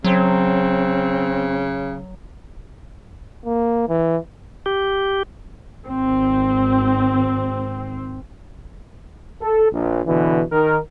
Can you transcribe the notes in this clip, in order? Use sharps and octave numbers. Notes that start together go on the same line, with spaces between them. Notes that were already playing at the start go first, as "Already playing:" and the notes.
C#3 F#3 C4
A#3
E3
G4
G#1 C4
A4
A#1
B2 D3 E3
D#3 A#4